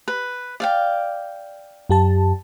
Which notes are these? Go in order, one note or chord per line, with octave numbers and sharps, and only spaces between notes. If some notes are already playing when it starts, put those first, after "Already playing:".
B4
D5 F5 G5
F#2 G4 A5